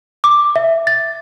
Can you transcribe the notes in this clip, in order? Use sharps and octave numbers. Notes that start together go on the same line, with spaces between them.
D6
E5
A6